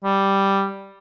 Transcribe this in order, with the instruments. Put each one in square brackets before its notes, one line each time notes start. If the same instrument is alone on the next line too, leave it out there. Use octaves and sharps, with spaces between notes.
[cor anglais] G3